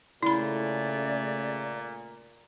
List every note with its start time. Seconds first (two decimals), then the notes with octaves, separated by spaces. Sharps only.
0.23 A#2 C#3 A3 E4 D5 B5